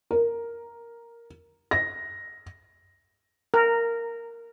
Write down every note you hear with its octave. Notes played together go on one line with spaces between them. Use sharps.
A#4
A#6
A#4